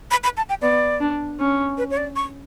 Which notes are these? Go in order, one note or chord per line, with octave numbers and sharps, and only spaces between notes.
B5
B5
A5
G5
B3 D5
D4
C#4
B4
C#5
D5
C#6